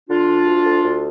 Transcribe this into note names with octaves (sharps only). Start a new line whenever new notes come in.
D3 D4 F4
D2
D2
D2
D2